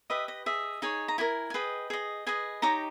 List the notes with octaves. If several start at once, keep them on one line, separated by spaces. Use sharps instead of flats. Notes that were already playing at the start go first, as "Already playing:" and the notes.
G4 B4 D#5 E5
D#5
G#4 D#5 E5
D#4 G#4 C#5 G#5
A#5
E4 G4 A#4 G#5
G#5
G#4 B4 D#5 G5
G#4 D#5
G#4 B4 D#5 G#5
D#4 G4 C#5 A#5